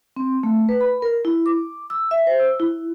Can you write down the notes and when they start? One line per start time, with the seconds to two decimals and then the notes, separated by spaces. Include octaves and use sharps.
0.16 C4
0.43 A3
0.69 B4
0.81 B5
1.02 A#4
1.25 E4
1.46 D6
1.90 E6
2.11 E5
2.27 C5
2.40 E6
2.60 E4